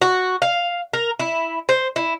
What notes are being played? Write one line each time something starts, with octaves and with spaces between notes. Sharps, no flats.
F#4
F5
A#4
E4
C5
E4